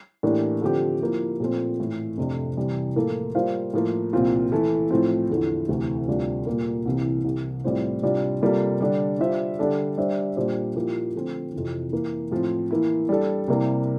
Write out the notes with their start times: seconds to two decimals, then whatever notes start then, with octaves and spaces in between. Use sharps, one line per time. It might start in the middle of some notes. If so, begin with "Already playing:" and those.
0.23 A2 E3 A#3 D4 G4
0.62 D3 F3 C4 G4
1.01 F3 A#3 E4
1.40 A#2 F3 A3 C4
1.79 A2 E3 A3
2.17 F2 C3 F3 A3 D4
2.57 C3 E3 G3 C4 E4
2.96 A2 F3 A#3 F4 A4
3.35 G3 A#3 F4 C5 F5
3.74 A2 F3 A#3
4.13 C2 A#2 F3 C4 F4
4.52 E3 A3 E4 A4
4.91 A2 F3 A3 C4
5.30 E2 D3 F3 A3 E4
5.69 D2 C3 E3
6.08 D2 C3 G3 D4 F4
6.47 A#2 G3 A#3
6.86 C2 C3 E3
7.24 C2 C3 E3
7.64 A2 G3 C4 F4 C5
8.03 C3 G3 D4 F4
8.41 C3 G3 A#3 F4 A4
8.81 D3 G3 D4 A4
9.19 G3 D4 F4 C5 E5
9.59 D3 G3 D4 A4
9.98 G3 D4 G4 C5 E5
10.36 A#2 G3 D4 G4 C5
10.75 A#2 F3 A#3 E4 G4
11.15 D3 F3 A3 C4
11.54 F2 C3 E3
11.92 E3 A#3 E4
12.31 A2 F3 C4
12.71 E3 A#3 E4
13.09 G3 D4 A4
13.48 C3 G3 A#3 E4 A#4